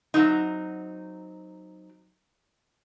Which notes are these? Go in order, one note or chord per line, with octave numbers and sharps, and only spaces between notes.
F#3 C4 D#4